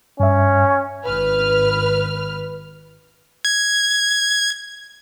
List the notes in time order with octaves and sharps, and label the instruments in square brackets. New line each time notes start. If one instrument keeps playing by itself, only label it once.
[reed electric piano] G2 E5 [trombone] C#4
[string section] G#1 B4 F6
[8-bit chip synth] G#6